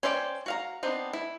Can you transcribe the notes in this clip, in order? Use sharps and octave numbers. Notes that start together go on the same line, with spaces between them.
C#4 C5 D5 D#5 G5
F#4 F5 A#5
B3 C4 D4 D#4
E4